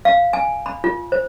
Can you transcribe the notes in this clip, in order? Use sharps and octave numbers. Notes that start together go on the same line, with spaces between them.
F5
G#5
B5
F4
C5